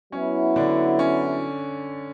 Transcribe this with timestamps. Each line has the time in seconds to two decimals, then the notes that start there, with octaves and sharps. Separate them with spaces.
0.12 F#3 B3 C#4 E4
0.56 D3 D4
0.99 C#4